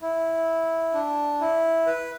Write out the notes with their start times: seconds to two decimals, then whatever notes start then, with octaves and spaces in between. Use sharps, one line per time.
0.02 E4
0.94 D4
1.41 E4
1.86 B4